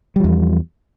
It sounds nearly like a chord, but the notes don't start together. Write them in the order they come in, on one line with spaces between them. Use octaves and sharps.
G3 F3 E2